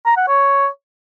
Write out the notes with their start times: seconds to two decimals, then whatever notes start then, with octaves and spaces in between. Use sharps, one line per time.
0.06 A#5
0.17 F#5
0.28 C#5